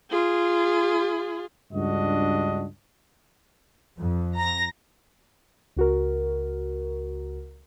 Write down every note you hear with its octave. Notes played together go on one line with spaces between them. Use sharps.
F4 G#4
C#2 G2 D4 F#4 D#5
F2
A#5 A#6
C#2 F#4 A#4